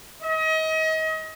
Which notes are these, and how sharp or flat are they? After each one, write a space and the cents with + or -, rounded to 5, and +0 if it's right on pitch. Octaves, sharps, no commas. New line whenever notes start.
D#5 +35